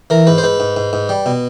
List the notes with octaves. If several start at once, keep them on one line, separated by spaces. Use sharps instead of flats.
E3 A#4
G#2 B4
C5
G#2 B4
G#2
G#2
G#2
G3
B2